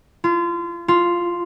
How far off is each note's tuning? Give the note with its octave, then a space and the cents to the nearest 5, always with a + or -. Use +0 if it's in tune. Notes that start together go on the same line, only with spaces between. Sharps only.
F4 -30
F4 -5